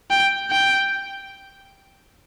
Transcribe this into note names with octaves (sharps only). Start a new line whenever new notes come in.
G5
G5